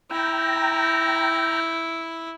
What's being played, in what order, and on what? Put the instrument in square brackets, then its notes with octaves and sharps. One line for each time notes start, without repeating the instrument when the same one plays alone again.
[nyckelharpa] E4 [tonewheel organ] G5 A#5